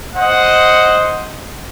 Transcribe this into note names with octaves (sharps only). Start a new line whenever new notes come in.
C5 D#5 F#5